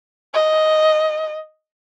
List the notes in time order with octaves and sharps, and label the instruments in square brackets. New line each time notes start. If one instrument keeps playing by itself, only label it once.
[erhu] D#5